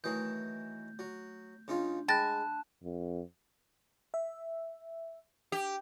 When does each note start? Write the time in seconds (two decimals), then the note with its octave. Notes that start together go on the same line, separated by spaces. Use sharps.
0.04 D#3 E3 F#3 A3 D#6 G6
0.99 F#3
1.68 C#3 D4 D#4 F4
2.08 G#3 G5 A5 B5 F#6 A6 A#6
2.83 F2
4.14 E5
5.52 G4